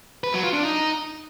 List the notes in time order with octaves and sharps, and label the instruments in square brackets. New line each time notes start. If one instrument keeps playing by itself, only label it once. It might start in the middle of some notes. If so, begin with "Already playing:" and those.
[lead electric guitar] B4
F#3
F4
D4
D#4